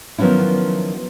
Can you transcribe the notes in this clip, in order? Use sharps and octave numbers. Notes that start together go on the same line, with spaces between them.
D#3 F3 F#3 B3 C#4 E4